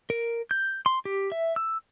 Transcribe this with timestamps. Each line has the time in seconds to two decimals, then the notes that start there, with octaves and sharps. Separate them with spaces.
0.10 A#4
0.51 G6
0.86 C6
1.05 G4
1.32 E5
1.56 E6